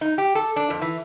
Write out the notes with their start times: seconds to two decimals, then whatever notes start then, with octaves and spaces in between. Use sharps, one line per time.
0.01 D#4
0.18 G4
0.35 A4
0.56 D4
0.70 F2
0.82 E3